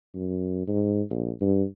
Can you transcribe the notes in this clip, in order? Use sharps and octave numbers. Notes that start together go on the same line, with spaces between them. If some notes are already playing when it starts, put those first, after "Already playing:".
F#2
G#2
A#1
G2